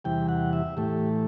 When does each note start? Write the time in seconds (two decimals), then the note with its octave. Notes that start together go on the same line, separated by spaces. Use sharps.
0.05 E2 C3 E3 G3 G5
0.29 F#5
0.53 E5
0.77 A2 E3 A3 G4